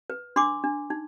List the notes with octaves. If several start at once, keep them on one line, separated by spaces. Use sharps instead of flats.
B4
D4 C6 D6
D4
D#4